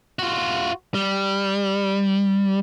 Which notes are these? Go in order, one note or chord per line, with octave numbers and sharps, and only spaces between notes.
F4 F#4
G3